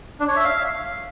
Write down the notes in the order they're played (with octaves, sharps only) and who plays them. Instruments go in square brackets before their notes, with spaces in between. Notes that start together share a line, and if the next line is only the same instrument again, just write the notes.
[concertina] D4
C#5
E5
F5